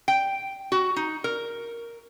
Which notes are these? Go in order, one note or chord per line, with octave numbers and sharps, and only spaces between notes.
G5
F#4
D#4
A#4